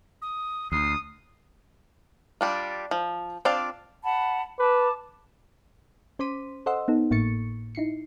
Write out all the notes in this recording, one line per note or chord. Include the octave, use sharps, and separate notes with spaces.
D#6
D2 D#6 C7
G3 D4 F4
F3
C4 D4 F4 D5 F5
F#5 A5 B5
B4 A5 D6
C#4 C5 C6 D6 B6 D#7
A4 C5 D#5 F#5 C6 E6
B3 D#4 A4
G#1 A2 A#3 C#6 A6 C#7
D#4 E4 C7 C#7